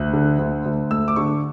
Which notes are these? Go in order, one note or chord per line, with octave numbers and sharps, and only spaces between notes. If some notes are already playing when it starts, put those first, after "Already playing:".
Already playing: D2 F#6
D3
D2
D2
A3 E6
D6
D3 C#6